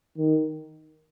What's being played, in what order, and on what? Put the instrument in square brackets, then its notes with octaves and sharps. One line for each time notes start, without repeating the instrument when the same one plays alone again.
[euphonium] D#3